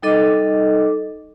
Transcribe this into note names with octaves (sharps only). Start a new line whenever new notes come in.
G3 D#4 A4 D#5 D6